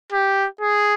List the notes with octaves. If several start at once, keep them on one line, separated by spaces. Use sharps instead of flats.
G4
G#4